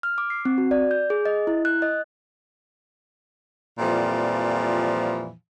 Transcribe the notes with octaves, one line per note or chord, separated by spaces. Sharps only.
F6
D6
C7
C4
F#4
D5
G6
G#4
D#5
E4
F#6
D#5
F2 A#2 E3 F3 G3